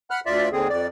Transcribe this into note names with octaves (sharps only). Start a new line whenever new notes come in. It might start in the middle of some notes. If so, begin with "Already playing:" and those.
F#5 B5 F6 F#6
D2 F4 D5 E5
D#2 D3 C4 G#4
F2 D5